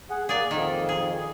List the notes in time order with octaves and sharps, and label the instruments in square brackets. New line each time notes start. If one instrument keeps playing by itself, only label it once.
[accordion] G#4 F#5
[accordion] A#3 [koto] G#4 D5
[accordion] F2 [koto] D#3
[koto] G#4